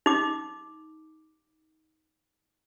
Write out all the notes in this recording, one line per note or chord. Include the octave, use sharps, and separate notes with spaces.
D#4 D6